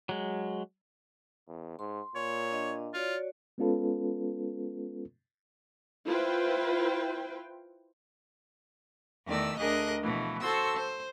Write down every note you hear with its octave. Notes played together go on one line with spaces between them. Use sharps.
F#3 G#3
E2
G#2 C6
A#2 C#5
D4 D#5
F4 F#4 C#5 D5
G#3 B3 C#4 F4 A4 B4
E4 F4 B4 C5 G5
E2 D#3 A3 D5 E6
D2 D3 G#4 A#4 D#5 F#6
B2 E3 F3 A3
F#4 A4 C5 A5 C6 E6
C5